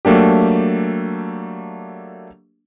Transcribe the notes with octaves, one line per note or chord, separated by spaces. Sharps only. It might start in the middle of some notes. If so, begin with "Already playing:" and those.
F#3 A3 A#3 D4 G4